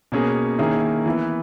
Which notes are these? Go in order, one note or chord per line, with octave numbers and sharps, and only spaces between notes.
B2 A#3 C#4 G#4
D#3 A#3 C#4 E4 G#4
E3 B3 E4